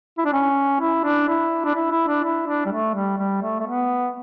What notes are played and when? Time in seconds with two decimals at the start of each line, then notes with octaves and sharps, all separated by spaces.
0.18 E4
0.25 D4
0.33 C#4
0.81 E4
1.04 D4
1.29 E4
1.65 D4
1.75 E4
1.91 E4
2.08 D4
2.24 E4
2.47 D4
2.66 G3
2.72 A3
2.94 G3
3.18 G3
3.42 A3
3.60 A3
3.67 B3